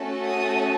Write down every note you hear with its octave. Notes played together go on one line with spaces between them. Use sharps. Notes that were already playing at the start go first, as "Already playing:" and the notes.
Already playing: A3 C#4 F#4 A4
D#6